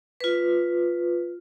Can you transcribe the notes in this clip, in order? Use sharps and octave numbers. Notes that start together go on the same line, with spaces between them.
F4 B4